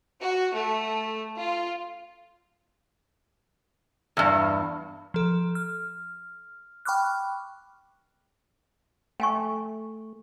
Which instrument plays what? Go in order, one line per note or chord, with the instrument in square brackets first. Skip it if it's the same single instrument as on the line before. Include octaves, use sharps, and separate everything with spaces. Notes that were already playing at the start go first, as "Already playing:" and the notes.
[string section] F#4
A3
F4
[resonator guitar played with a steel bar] E2 G2
[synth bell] F3 A4
F6
G5 B5 C#6 D6 F6 F#6
[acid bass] A3 [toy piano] G5 G#5 C#6